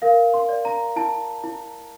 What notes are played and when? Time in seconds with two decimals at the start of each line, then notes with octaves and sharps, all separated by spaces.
0.02 A#4 F5
0.34 C6
0.49 D5
0.65 A#5
0.96 E4 A5
1.44 E4